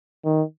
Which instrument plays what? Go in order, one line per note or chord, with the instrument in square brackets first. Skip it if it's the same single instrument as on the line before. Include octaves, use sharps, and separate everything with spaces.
[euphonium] D#3